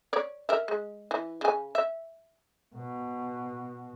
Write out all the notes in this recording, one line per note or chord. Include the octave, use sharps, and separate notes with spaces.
C#5 D5
A#4 E5
G#3
E3
C#3 G#5
E5
B2